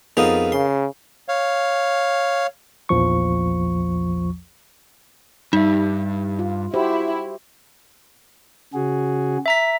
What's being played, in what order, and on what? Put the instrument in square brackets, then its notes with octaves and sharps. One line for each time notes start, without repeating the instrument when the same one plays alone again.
[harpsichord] F2 B3 D#4 [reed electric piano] G#4 A#4 F5
[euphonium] C#3 [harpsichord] C6
[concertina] C#5 F5
[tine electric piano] A#1 E2 F3 C#6
[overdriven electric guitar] G2 [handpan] G3 E5 [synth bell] D#4
[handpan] F4
[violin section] E4 [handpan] F#4 G4 C5
[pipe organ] C#3 F#4 G#4
[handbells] E5 A#5 B6